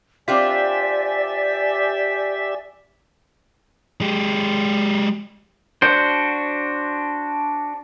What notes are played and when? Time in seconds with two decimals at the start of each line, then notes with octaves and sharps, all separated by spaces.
0.28 C4 D4 F4 G4 D5 E5 G#5
4.02 G#3 G4
5.82 D4 F#4 C5